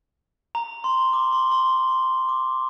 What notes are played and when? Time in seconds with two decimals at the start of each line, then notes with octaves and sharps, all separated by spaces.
0.55 A#5
0.84 C6
1.13 D6
1.33 C6
1.51 C6
2.29 D6